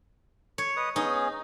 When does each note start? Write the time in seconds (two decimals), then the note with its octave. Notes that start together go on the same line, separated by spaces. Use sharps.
0.58 C#5
0.77 B4 D#5 D#6
0.96 B3 C#4 D#4 G#4